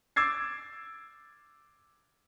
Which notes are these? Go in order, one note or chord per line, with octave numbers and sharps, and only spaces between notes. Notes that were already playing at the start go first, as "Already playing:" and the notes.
D6 E6 G#6 A6 C7